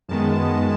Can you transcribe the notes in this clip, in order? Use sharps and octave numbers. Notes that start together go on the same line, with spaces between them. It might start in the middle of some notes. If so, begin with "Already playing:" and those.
F#2 D#3 G#3 B3 A5